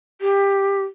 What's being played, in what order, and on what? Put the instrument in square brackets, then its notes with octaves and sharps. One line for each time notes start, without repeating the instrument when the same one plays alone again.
[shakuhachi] G4